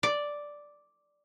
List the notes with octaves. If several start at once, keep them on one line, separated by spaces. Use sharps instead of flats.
D5